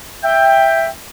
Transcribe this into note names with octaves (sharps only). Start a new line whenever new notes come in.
E5 G5